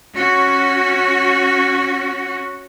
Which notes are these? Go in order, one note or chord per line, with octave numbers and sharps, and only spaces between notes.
C#4 F#4